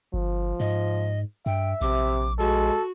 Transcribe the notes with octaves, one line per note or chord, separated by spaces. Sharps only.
G1 F3
G#2 D#5
G2 E5 G5
A#1 C3 D6
G#3 F#4 A4